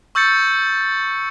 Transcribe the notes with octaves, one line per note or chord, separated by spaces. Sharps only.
C#6 E6 G6 A6 C#7